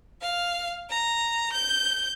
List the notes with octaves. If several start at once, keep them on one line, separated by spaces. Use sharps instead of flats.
F5
A#5
G6